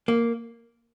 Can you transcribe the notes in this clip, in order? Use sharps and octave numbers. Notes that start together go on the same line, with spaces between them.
A#3